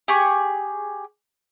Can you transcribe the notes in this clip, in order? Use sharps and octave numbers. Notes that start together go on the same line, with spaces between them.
G4 G#4 C#6